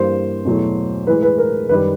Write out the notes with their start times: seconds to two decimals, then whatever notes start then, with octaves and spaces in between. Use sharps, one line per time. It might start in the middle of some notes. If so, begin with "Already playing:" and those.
Already playing: G2 E3 G3 A#3 C5
0.45 E2 B2 F#3 A3
1.07 A2 E3 G#3 B4
1.23 B4
1.38 A#4
1.69 F#2 D#3 G3 B4